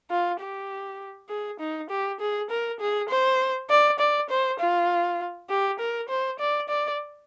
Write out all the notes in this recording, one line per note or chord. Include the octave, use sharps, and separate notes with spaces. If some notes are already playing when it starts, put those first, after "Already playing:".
F4
G4
G#4
D#4
G4
G#4
A#4
G#4
C5
D5
D5
C5
F4
G4
A#4
C5
D5
D5